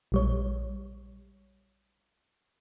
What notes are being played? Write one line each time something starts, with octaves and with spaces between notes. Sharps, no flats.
A#1 G3 C#5